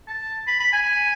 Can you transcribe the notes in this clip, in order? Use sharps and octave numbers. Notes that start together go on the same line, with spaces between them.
A5
B5
B5
G#5